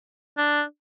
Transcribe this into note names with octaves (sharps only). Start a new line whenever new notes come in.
D4